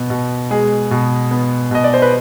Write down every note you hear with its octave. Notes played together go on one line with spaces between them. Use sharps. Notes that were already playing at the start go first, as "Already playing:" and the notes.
Already playing: B2 B3
B2
G#3 G#4
B2
B3
B2 D#5
D5
C5
B4